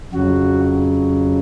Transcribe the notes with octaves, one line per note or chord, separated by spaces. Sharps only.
F2 C#3 F#3 F#4